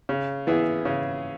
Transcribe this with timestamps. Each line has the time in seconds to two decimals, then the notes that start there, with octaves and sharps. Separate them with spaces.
0.09 C#3
0.47 E3 B3 E4 G#4
0.85 C#3